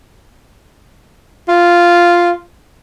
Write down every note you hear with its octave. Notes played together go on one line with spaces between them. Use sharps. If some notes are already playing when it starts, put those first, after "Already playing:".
F4